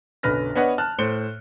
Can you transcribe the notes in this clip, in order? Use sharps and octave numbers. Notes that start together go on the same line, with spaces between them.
B1 F#2 D3 B4 F6 A#6
B3 D4 B4 C#5 D#5 F#5
A5 F6 F#6
A2 C5 C#7 G7